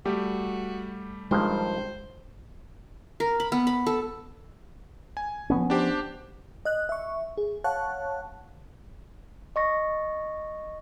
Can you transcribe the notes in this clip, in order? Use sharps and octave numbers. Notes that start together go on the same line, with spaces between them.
G3 A3 F#4 G4
G2 D#3 F3 G#3 C5
A#4
B5
B3
B5
A4
G#5
F3 B3 C#4
D4 G4 C5
D#5 F#6
E5 C#6
G#4
C#5 F5 F#5 A5 C#6 F#6
D#5 C#6 A#6